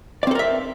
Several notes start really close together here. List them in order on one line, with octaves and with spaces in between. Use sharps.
D5 C4 A4 A#4 E5